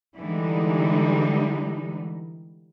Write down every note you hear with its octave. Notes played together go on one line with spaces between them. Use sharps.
D3 E3 G3 G#3 D#4